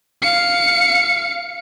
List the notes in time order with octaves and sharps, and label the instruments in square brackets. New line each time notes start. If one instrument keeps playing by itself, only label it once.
[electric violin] F5 C#7